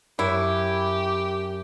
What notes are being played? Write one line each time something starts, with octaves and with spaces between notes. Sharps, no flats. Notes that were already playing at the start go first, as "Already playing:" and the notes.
F#2 E4 G4